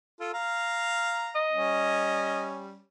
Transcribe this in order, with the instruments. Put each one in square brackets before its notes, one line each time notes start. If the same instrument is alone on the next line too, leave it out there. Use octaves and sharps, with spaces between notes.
[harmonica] F4 A4
F5 A#5
[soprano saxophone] D#5
[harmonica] G3 C#4